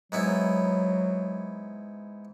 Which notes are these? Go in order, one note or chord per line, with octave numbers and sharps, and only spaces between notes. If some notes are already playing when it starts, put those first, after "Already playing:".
G#2 F#3 B3 E4